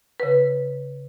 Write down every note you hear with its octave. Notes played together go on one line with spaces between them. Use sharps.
C#3 B4